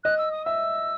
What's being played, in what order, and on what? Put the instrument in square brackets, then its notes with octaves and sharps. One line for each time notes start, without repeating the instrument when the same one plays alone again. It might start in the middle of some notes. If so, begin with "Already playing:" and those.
[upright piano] D#5 [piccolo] F#6
[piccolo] E6
D#6
[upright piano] E5 [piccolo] E6